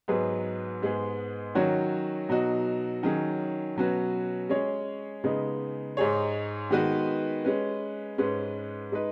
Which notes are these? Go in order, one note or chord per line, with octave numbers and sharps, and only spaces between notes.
G#2 F#3 B3 G#4 B4
G#2 G#3 B3 G#4
D#3 F#3 C#4 F#4 C#5
B2 F#3 D#4 F#4
D#3 F#3 C#4 G#4
B2 F#3 C#4 F#4 B4
G#3 C#4 G#4 C#5
C#3 G#3 B3 D#4
G#2 G#3 D#4 G#4 C#5
D#3 G#3 B3 F#4 B4
G#3 C#4 B4
G#2 G#3 C#4 B4
G#3 D#4 B4